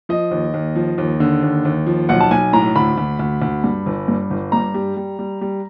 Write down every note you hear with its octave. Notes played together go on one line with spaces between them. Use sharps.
F3 D#5
D#2
D#2
F3
D#2
D3
D#2
D#2
F3
B1 F#5
A5
B1 G#5
A2 A#5
D2 B5
D2
D2
D2
G2
G1
G2
G1
G2 A#5
G3
G3
G3
G3